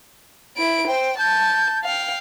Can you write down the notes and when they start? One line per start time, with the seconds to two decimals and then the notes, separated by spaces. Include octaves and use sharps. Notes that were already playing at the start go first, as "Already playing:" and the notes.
0.57 E4 D7
0.87 C5 G5
1.18 A5 G6
1.84 F5 G5